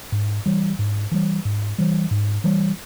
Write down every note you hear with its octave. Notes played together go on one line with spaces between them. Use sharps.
G#2
E3 G3
G#2
E3 G3
G#2
E3 G3
G#2
E3 G3